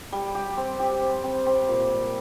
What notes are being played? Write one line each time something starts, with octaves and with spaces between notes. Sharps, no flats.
G3
G4
C4
G4
C4
C4
C4
A#2
G3